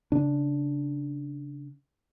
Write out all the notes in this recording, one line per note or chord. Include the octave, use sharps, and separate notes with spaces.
C#3 D4